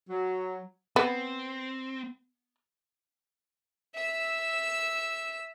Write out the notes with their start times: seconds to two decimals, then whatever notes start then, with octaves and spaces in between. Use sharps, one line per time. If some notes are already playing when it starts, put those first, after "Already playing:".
0.10 F#3
0.96 B3 C4
3.95 E5 E6